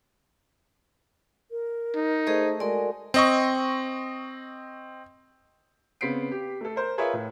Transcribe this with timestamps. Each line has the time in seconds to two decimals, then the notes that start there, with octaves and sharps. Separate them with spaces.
1.51 A#4
1.95 D#4
2.27 A3 G#4 C5 D#5
2.60 G#3 F#4 A#4 D5
3.14 C4 D#5 C#6
6.01 C#3 B3 C4 B6 C7 D7
6.31 G4
6.61 A3 A4
6.76 A#4 C5
6.98 F4 G#4 A#4 B4 C#5 E5
7.13 A2